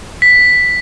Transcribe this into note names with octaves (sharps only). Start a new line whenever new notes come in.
B6